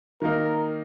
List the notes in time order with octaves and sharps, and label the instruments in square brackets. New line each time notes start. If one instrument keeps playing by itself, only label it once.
[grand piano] D#3 A#3 D#4 [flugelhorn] A#4